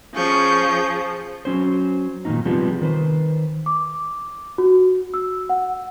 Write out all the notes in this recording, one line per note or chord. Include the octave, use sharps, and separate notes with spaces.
F3 C#4 G#4 C#6 G6
F#3 C#4 C5
A#2 D#3 G3 C#4 D#4
C3 F3 G3 G#3 B3
D#3 B4 C5
D6
F#4
E6
F#5